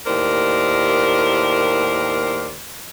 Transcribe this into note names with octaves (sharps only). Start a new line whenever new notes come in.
D#2 A2 A#4 C5 D5